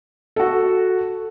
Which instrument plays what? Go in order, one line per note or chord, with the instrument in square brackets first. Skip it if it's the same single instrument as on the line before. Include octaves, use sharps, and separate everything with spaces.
[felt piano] F#4 A4